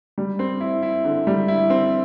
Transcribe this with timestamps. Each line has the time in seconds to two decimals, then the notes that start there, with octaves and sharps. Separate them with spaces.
0.18 G3
0.39 C4
0.60 E4
0.82 E4
1.04 D3
1.27 G3
1.48 E4
1.70 C4